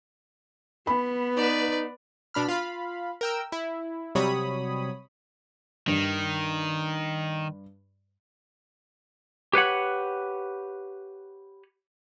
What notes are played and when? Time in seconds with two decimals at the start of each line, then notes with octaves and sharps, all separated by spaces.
0.87 B3 B5
1.36 D#4 B4 D5
2.34 B2 D4 B5 F6
2.48 F4 F5 B5
3.21 A#4 G5 E6
3.52 E4
4.15 C3 F#3 G3 C#5 B5 D#6
5.88 G2 D#3 G3
9.53 G4 B4 C#5 F#5